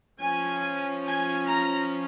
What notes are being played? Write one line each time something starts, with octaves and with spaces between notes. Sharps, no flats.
F3 C#4 G#5
G#5
A#5